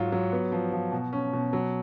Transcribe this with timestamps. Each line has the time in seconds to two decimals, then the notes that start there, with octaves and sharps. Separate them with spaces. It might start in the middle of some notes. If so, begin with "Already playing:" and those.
Already playing: G#2 F#3 F4
0.12 F#3
0.32 B3
0.52 F3
0.72 F3
0.92 B2
1.13 C#4
1.33 B2
1.53 F#3